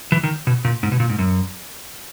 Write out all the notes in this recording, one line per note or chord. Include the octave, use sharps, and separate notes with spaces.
E3
D#3
B2
A#2
G#2
B2
A#2
G#2
F#2